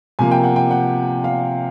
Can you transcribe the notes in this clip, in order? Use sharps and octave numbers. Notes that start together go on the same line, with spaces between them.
C3 F3 A#3 G#5
G5
F#5
G5
F#5
F5